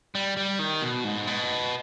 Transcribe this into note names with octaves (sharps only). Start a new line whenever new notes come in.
G3
G3
D#3
B2
G#2
B2